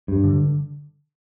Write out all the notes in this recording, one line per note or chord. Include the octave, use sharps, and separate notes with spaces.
G2
D3